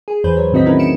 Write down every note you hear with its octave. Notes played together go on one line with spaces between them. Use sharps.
G#4
E2 E3 B4 C5 G6
F#3 C#5
A2 D#3 C4 F#4 D#5 B6
D#3 C#4 D#4 E4 A#4 B4
C#7 D7 E7